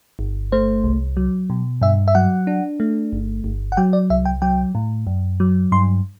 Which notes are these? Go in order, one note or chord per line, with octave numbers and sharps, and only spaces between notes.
G1
A3 C5
C2
F#3
B2
G2 E5
E5
F#3 F#5
D4
A3
G1
G1
F#5
F#3 G5
D5
C2 E5
G5
F#3 G5
A2
F#2
F#3
G2 C6